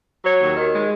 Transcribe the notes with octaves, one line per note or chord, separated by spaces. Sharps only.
F#3 C#5
D#2
D#3
G#3